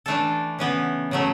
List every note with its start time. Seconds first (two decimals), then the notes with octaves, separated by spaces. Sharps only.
0.06 E3 A3 D4 A4
0.59 C#3 E3 B3
1.11 C#3 F#3 A3